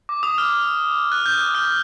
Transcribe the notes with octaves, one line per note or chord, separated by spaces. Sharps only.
D6
D#6
F6
F#6
G6
F6